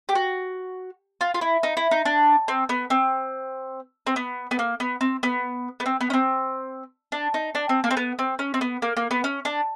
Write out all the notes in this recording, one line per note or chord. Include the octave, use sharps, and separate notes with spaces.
G4
F#4
F4
F4
E4
D#4
E4
D#4
D4
C4
B3
C4
C4
B3
B3
A#3
B3
C4
B3
B3
C4
B3
C#4
C4
D4
D#4
D4
C4
A#3
C4
B3
C4
C#4
C4
B3
A#3
A#3
B3
C#4
D4